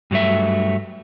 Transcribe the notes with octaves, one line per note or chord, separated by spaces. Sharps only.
G2 F#3 A3 E5